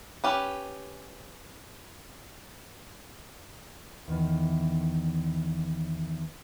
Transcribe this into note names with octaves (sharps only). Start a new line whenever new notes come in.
C#4 G4 B4
E2 D#3 E3